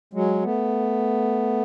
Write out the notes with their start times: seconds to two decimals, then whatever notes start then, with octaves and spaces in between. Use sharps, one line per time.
0.13 F#3 G#3
0.42 A3 B3